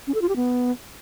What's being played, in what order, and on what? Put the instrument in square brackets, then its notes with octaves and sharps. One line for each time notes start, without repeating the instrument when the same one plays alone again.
[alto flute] C#4
A4
F4
G4
B3